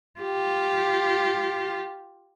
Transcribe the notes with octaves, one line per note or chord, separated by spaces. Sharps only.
F4 G4